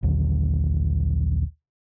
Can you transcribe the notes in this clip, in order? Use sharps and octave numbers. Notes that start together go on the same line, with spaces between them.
A#1 D#2 D3 F#3